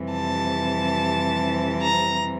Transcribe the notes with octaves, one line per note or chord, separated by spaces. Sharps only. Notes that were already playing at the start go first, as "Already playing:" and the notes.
Already playing: F2 C3 E3 G3
A5
A#5